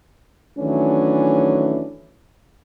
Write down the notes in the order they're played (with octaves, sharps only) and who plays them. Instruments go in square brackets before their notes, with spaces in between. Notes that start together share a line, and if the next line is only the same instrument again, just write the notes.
[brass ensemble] D#3 E3 F#3 A3 C#4 D4